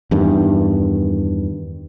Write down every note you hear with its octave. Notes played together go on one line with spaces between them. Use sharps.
E2 G2 D#3